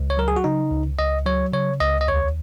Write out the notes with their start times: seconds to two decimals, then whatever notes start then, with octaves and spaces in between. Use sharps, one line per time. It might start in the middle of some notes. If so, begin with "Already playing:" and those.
Already playing: C#2
0.10 C#5
0.17 F#3 A#4
0.28 G#4
0.36 F#4
0.44 C#3 D#4
0.71 C#2
0.99 C#2 D#5
1.26 F#3 C#5
1.53 C#3 C#5
1.80 C#2 D#5
2.01 D#5
2.08 D#2 C#5